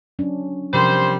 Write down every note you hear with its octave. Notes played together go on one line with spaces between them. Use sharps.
F#3 C#4 D4
C3 F3 G3 A#4 C5